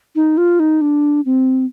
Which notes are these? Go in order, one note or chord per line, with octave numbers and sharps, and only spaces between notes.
D#4
F4
D#4
D4
C4